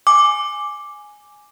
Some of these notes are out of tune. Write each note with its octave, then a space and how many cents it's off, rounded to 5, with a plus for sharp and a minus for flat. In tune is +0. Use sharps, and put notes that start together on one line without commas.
G#5 +0 D6 +0